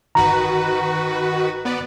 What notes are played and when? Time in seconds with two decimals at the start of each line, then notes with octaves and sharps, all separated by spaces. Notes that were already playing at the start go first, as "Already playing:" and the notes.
0.15 G1 D#3 F#4 B4 A#5
1.65 B3 B4 D5